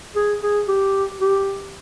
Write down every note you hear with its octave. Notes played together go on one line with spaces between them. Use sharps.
G#4
G#4
G4
G4